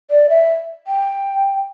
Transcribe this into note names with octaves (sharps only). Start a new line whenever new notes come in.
D5
E5
G5